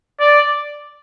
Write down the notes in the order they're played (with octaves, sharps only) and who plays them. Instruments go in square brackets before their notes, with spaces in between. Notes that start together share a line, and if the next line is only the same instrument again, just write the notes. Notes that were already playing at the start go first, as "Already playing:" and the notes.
[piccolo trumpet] D5